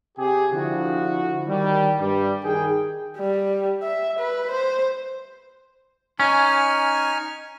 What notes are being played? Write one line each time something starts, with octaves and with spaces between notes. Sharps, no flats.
C3 G4 G#4
D3 F3 E4 F#4
D#3 G3
G2 G3
D#3 G#4 G5
G3
E5
B4
C5
C#4 D#4 G#5 F6